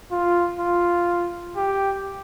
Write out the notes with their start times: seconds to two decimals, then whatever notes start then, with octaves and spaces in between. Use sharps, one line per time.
0.12 F4
0.59 F4
1.57 G4